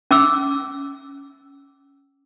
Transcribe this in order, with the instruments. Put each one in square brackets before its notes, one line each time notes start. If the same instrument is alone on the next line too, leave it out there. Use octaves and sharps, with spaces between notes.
[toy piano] C#4 D6 E6